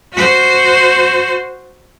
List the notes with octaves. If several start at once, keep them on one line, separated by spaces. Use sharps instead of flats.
F#4 C5